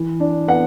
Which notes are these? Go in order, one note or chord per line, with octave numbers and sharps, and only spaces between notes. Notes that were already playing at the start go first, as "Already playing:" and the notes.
Already playing: E3
D4
B3 F#5